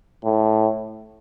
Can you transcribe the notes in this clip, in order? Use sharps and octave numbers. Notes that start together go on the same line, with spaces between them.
A2